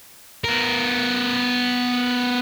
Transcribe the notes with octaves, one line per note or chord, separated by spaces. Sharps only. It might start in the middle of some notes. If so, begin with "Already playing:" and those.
B3 A#4